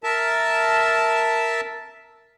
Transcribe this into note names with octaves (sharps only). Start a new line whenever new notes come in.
A#4 E5 A5